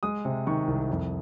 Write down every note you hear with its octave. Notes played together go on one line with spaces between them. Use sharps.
G#3 D#6
C3
D#3 C#6
C2
F2